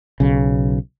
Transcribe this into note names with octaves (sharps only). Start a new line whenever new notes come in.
B1 C#3